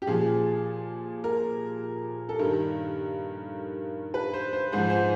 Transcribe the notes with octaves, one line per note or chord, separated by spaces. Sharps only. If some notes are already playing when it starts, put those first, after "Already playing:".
G4
A#2 F3 G#4
A#4
A4
G2 A#4
D#3
B4
C5
C5
G#2 F3 C5
C5